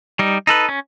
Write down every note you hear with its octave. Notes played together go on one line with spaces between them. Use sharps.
G3 D#4
D#4 A4 B4
C#4